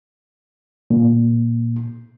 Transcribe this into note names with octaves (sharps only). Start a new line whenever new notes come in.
A#2